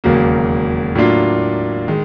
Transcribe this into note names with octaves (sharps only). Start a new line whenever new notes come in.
E1 D#2 C#3 F#3 A#3
A2 F#3 A#3 D4 F4
D#3 G#3